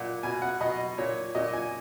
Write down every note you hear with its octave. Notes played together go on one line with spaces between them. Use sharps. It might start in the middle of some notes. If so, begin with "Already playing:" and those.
Already playing: A#2 F#5
B2 G#5
F#5
B2 D#5
A#2 C#5
A#2 D#5
G#5